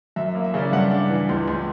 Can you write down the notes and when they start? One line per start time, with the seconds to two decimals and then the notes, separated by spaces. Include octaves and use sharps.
0.16 F#2 E5
0.35 A#3
0.44 E5
0.54 C#3 D5
0.72 G2 F#5
0.91 D4
1.10 E3
1.29 C#2
1.48 C#2